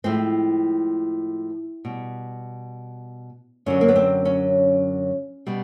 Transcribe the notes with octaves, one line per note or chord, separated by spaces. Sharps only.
A2 F3 G#3 C4
B2 G3
F#2 D3 F#3 C#4
A#3
B3
C4
C#4
B2 G3